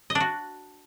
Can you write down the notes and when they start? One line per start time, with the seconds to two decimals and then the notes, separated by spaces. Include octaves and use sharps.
0.10 D#5
0.15 D4
0.20 F#4